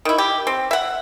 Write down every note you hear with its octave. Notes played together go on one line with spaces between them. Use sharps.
D#3 E4
G4
C4
E5 F#5